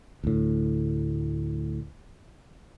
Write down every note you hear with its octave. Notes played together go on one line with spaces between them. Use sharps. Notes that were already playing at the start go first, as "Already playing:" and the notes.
D2 A2